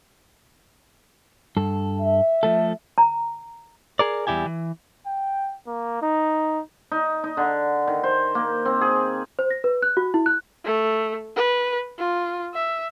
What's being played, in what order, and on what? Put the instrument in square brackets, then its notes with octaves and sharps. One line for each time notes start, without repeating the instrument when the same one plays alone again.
[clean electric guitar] G2 A4
[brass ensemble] E5
[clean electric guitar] F3 A3 A4
[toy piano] A#5
[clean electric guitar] G#4 A#4 D5
E2 D#3 G3 E4 G4 G#5
E3
[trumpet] G5
A#3
D#4
[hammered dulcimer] D#4
D#4
D3
D#3
C5
A#3
C4
G#4
[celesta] C5
A#6
B4
F#6
F#4
E4
F#6
[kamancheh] A3
B4
F4
E5